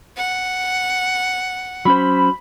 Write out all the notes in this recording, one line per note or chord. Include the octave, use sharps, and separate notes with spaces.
F#5
F#3 C#4 C5 B5